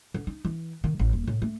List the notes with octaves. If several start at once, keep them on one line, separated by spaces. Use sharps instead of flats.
D3
D#4
E3
D#3
A1
D#1
A2
A3